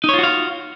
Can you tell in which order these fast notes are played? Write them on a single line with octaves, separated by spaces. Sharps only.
D#4 C#5 F4 F#4 F5